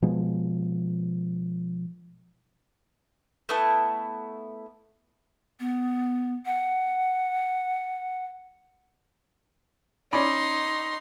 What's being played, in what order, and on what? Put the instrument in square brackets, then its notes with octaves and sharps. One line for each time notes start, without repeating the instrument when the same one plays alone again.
[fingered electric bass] B2 F3 G#3
[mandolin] A3 B3 E4 A5
[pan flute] B3
F#5
[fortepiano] C#4 D5 B5 [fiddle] D#4 C6